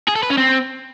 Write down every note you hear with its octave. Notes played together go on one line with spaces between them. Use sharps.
G#4
A4
B4
C#4
C4